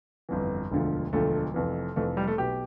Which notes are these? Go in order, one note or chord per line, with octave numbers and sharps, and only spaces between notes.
G1 F2 E3
E1 D2 D3 F3
E1 D2 D3 F3 A3
F1 F2 E3
F1 F2 E3 A3
G3
A3
B1 B2 G4